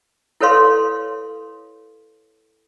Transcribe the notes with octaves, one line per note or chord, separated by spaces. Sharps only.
E4 A4 B4 C#5 F5 C6